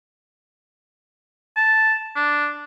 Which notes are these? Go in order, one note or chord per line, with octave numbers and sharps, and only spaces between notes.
A5
D4